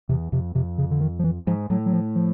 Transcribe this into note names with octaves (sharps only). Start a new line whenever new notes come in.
E2 C3
F2 C3
F2 C3
C#3
D3
D#3
F3
E3
G#2 F3
A2 F#3
F#3
F3
F3